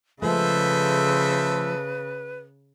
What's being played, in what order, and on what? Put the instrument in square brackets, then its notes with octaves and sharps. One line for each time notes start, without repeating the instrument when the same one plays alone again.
[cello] C#3 [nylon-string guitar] F3 G#3 A3 [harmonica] A4 C5 E5 [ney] B4